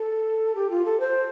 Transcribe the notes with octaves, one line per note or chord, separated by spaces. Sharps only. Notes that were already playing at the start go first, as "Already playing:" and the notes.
Already playing: A4
G4
F4
A4
C5